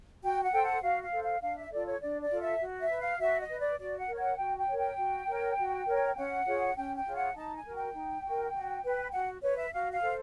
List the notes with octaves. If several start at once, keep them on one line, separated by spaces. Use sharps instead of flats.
F#4 G5
F#5
A4 C5 G5
F#5
F#4 F5
F5
A4 C5
F5
D4 F5
E5
F4 A4 D5
C#5
D4 D5
D5
F4 A4
E5
F#4
E5
B4
F5
F#4 E5
D#5
B4
D5
F#4 D5
F#5
A#4 C#5
F#5
F#4 G5
G5
A#4 C#5
G5
F#4
A#4 C#5
F#4
A#4 C#5
C#4 F#5
F4 G#4 C#5
C#4 G5
G5
F4 G#4 C#5
F#5
D#4 A5
G#5
F#4 A#4
G5
D#4
F#4 A#4
F#4
B4
F#4 F#5
B4 C#5
E5
F#4 F5
F5
A4 C5